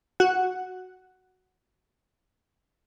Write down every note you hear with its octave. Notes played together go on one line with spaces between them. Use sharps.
F#4 F#5